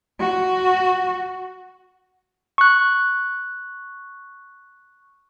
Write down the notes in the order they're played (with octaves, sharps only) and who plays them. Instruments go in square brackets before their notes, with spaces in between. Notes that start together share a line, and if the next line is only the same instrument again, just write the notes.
[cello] F#4
[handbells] C#6 F#6